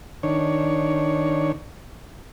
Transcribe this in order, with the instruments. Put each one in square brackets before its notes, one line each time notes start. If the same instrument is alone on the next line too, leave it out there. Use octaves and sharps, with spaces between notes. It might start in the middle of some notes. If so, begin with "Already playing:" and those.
[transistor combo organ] D#3 D4 C#5